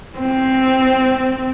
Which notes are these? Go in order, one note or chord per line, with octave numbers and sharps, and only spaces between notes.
C4